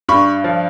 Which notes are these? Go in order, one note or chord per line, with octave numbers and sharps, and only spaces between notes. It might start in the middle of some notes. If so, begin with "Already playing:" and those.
G2 B5 C#6
F3